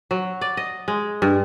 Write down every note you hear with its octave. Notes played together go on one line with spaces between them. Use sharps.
F#3
D5
D#5
G#3
G2